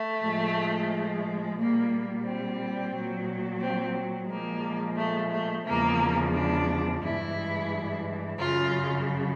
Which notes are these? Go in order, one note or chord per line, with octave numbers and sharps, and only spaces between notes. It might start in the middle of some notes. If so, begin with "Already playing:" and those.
Already playing: A3
A2 F3 G#3
A#2 G3 A#3
C4
A#2 F#3
C4
A#2 F3 G#3 A#3
A3
A3
E2 C#3 F3 G#3 A#3
D4
G2 E3 G#3 E4
F#2 C#3 F#3 F4